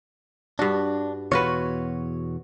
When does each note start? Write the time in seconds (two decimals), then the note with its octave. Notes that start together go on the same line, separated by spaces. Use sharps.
0.59 G2 D4 F#4
1.32 E2 B2 F4 F#4 B4 C#5